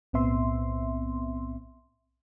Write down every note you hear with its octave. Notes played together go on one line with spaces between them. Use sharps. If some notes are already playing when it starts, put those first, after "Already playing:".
B1 A2 B3 C4 E5 C6